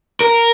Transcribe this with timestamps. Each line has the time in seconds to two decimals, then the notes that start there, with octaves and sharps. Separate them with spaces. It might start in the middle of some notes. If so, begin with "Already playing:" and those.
0.21 A#4